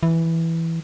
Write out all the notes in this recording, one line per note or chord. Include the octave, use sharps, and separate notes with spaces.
E3